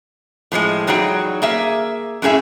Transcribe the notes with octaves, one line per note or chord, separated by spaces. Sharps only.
A2 F3 F#3 G#3
E2 F#3 G3 D#4 G#4 G5
A#3 G#4 E5
F#2 A2 C#4 G#4 E5